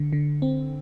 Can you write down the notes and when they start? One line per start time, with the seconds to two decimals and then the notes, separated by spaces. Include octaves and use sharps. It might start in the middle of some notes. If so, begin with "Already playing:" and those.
Already playing: D3
0.13 D3
0.42 C4